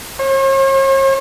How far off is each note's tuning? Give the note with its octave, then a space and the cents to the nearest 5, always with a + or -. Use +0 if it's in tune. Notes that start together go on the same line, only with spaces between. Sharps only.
C#5 -45